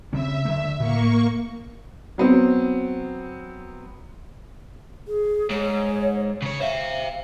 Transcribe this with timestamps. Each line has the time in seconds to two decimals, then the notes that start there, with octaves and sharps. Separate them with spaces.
0.13 C#3 C4 E5
0.45 D3 A3
0.80 A2 A#3 C#6
2.18 F#3 B3 C4
5.07 G#4
5.50 G#2 C#5
6.42 C#3 C#5
6.60 C5 E5 F5